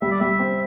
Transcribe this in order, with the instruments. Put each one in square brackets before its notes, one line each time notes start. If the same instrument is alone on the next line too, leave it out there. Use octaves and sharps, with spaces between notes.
[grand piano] G3 [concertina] E5
[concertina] D5
[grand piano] G3 [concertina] E5
[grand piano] C4